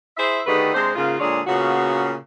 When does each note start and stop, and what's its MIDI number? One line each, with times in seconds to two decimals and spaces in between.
0.17 0.40 64
0.17 0.40 68
0.17 0.40 72
0.17 0.40 76
0.46 0.73 50
0.46 0.73 51
0.46 0.73 57
0.46 0.73 67
0.46 0.73 68
0.46 0.73 71
0.75 0.91 48
0.75 0.91 56
0.75 0.91 62
0.75 0.91 72
0.96 1.16 44
0.96 1.16 49
0.96 1.16 58
0.96 1.16 65
1.19 1.40 46
1.19 1.40 50
1.19 1.40 56
1.19 1.40 68
1.19 1.40 73
1.19 1.40 74
1.46 2.13 46
1.46 2.13 49
1.46 2.13 59
1.46 2.13 61
1.46 2.13 65
1.46 2.13 66